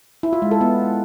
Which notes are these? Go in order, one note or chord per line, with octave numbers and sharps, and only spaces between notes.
E4
F4
G#3
A4
B3